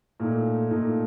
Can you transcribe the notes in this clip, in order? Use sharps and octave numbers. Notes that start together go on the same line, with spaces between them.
A#2 A3 D#4
A#2 A3 D#4